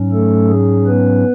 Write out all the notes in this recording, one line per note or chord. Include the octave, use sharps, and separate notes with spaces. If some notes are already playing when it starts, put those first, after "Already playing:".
Already playing: G#2 F#3 C#4
A3 A4
G#4
B3 B4